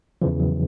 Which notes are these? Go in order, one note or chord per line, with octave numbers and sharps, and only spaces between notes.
E2 C#3 E3 F3
F#3